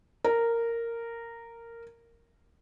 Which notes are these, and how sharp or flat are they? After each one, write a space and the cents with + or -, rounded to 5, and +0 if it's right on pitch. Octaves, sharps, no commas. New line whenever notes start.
A#4 -10